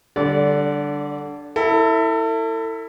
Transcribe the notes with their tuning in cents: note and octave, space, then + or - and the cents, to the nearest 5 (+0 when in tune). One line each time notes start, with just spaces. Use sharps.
D3 +0 G3 +0 D5 -30
E4 -5 A4 +35